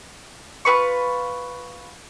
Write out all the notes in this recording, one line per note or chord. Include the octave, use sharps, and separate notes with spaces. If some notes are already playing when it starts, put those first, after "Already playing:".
F4 G#4 B4 C#6